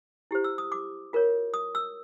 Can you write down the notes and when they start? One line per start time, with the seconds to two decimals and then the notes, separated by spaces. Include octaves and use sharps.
0.31 E4 G4 C5
0.44 E6
0.58 D#6
0.72 D6
1.13 F4 A#4 C#5
1.54 D#6
1.75 E6